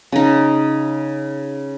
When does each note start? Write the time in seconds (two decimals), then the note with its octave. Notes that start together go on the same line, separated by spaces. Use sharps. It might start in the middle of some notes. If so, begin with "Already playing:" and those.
0.12 C#3 D#4